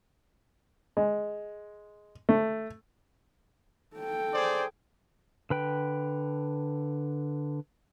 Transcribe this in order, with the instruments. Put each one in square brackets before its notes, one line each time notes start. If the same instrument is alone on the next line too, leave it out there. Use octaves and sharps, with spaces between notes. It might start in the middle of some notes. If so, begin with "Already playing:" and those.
[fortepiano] G#3
A3
[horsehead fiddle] A4 G5
[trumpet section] G#4 C5 D5
[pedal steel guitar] D3 B4 G5